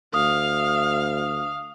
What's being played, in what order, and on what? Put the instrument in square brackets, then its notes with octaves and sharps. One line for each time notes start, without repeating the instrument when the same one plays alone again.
[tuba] D2 [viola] F5 [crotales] D#6